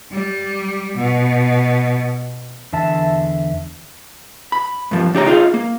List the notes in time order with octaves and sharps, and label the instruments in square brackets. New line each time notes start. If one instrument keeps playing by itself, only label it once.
[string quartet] G3
B2
[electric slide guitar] E2 D3 E5 A5
[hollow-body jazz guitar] B5
G2 F3
D2 D4 G4 C#5 A#5
D#4 F4 G#4 F5
A#3